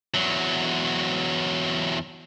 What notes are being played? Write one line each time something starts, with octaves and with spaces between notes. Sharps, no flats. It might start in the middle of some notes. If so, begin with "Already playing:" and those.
E2 F#3